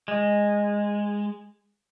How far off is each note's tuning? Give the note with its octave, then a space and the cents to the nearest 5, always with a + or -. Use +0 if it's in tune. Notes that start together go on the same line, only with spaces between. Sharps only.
G#3 -10